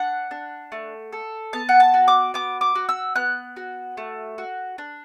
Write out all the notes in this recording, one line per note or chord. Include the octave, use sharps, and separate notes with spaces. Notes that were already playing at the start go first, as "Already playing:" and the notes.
Already playing: D4 F#5
D4
A3
A4
B3 A5
F#5
A5
F#4
D6
B3 D6
D6
F#4
E6
B3 F#6
F#4
A3
F#4
D4